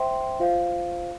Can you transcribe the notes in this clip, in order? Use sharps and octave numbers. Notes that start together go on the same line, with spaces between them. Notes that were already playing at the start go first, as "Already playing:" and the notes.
Already playing: C5 E5 G5 C6
F4 C5 F5